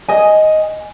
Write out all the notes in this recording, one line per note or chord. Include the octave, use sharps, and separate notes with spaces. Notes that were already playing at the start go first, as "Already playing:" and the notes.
D#5 G#5